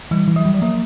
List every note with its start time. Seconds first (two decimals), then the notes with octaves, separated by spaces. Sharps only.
0.11 E3 G3
0.27 E3
0.36 F#3
0.45 G3
0.54 F3
0.62 F#3 A#3